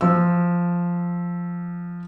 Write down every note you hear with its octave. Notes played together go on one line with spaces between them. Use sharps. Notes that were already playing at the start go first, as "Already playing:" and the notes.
F3 E6